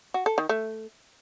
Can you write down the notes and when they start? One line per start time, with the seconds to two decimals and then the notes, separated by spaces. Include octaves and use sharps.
0.14 F#4
0.26 A4
0.38 D#3
0.49 A3